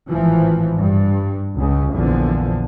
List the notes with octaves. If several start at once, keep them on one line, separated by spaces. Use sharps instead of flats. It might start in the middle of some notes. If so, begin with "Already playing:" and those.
G#1 A2 E3 F3
G2
C#2 C#3
A#1 E2 D3 F3